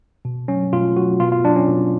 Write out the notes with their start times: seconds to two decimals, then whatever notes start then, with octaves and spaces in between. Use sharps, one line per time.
0.25 B2
0.48 F#3 C#4
0.73 B2 F4
0.97 F#3 F#4
1.20 B2 F4
1.32 F4
1.44 F#3 D4
1.56 C#4
1.68 B2